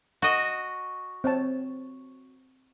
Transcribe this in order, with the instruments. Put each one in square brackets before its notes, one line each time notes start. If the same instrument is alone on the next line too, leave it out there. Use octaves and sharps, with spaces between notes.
[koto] F#4 D#5
[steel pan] C4 C#5 A5